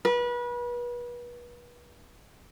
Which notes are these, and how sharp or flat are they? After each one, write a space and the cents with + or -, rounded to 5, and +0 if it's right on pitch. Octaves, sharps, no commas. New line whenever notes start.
B4 -35